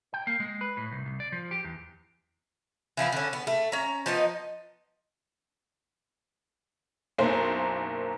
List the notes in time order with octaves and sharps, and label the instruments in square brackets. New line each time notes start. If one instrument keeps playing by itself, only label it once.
[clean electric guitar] G5
A#3
G#3
B4
A2
C2
C2
D5
F3
G4
E2
[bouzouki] E3 F3 B3 E4
D3 C#4
B3
A3
C#4 A#5
F3 B3 D#4 D#5
[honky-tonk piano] F#1 B1 A#3 C5